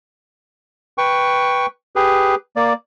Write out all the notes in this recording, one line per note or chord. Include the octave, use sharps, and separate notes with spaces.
B4 G5 C#6
G4 G#4 B4
A#3 D5